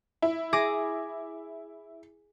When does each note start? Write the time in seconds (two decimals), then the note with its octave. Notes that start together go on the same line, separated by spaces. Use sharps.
0.22 E4
0.53 G#4 D6 A#6